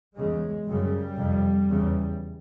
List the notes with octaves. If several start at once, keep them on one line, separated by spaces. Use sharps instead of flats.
E2 C#3 G#3
F#2 C#3 G3
F2 C3
E2 C#3